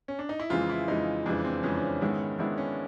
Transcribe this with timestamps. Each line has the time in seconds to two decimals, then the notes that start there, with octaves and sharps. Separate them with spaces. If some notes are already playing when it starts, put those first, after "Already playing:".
0.08 C#4
0.19 D4
0.29 D#4
0.40 E4
0.50 F2 C#3 E3 G#3 F4
0.69 E4
0.88 F2 C#3 E3 G#3 D#4
1.26 F2 C#3 E3 G#3 D4
1.45 C4
1.63 F2 C#3 E3 G#3 C#4
1.74 D4
1.85 C#4
2.01 G#2 D#3 G#3 B3 E4
2.38 G#2 D#3 G#3 B3 D4 E4
2.58 C#4